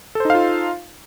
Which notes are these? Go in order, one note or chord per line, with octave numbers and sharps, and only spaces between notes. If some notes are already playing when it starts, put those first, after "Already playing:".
D#4 F4 A4 C5 F5